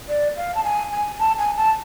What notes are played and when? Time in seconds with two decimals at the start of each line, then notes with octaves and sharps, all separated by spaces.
0.09 D5
0.37 F5
0.55 A5
0.64 G#5
0.92 G#5
1.19 A5
1.39 G#5
1.57 A5